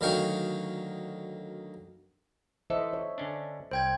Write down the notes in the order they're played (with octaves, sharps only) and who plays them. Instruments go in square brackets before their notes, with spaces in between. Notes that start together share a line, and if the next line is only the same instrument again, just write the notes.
[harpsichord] D2 D#3 F#3 F5 G5 C#6
[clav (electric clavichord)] E3 A4 [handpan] C5 D#5 E5
[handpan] C#5
[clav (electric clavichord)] D3 C#4 D4
[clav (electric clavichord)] C2 [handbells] C5 G5 G#6